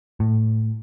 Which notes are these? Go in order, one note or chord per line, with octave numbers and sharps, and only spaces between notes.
A2